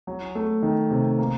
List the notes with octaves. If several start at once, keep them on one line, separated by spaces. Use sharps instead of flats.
F#3
A3
D#3
C3
A#3